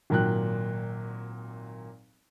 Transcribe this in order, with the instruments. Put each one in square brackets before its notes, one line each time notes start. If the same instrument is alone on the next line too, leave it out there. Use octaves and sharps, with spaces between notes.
[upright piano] G#1 A#2 F#3 G5 F#6